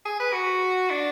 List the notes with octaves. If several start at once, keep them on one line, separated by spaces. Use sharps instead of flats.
G#4
B4
F#4
D4